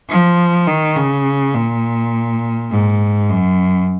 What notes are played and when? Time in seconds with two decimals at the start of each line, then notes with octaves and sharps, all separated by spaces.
0.10 F3
0.68 D#3
0.96 C#3
1.55 A#2
2.71 G#2
3.28 F#2